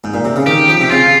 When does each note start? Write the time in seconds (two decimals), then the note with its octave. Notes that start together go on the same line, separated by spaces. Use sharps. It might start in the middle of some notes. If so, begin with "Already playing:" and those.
0.04 G#2
0.14 A#2
0.25 C3
0.36 C#3
0.46 D#3 G4
0.68 F3
0.81 C3
0.91 C#3 F4